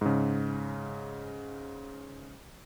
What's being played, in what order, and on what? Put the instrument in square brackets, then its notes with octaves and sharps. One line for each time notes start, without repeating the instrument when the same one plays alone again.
[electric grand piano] G#2 C#3